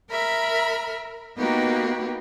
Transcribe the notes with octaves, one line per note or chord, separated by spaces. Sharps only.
A#4 E5 B5 F6
A#3 B3 D#4 F#4 G4 B4